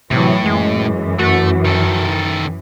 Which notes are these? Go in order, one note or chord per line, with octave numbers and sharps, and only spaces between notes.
A2 C3 E3 F#3
F#2 E3 G#3
A3 F#4
D#3 A4